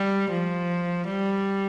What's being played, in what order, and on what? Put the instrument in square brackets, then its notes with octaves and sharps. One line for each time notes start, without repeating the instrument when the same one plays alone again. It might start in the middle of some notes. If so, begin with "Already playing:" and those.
Already playing: [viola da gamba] G3
F3
G3